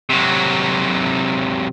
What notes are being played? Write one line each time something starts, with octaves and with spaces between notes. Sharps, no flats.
C3 F#3